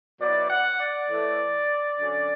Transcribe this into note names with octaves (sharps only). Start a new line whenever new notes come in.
B2 F#3 B3 E4 D5
F#5
D5
A2 E3 A3
D3 F#3 C#4